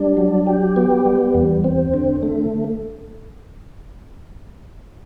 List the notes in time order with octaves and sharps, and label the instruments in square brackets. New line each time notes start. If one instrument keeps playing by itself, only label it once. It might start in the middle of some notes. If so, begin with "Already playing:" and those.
Already playing: [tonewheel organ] G3 D4
F#3
G4
B3
G3
E2
C4
D3
A3